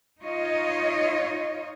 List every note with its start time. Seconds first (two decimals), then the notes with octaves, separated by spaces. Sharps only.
0.22 D#4 F4 C#5 D#5